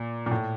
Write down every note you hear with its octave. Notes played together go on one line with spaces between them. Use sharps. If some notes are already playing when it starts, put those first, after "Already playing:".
Already playing: A#2
A#2
A2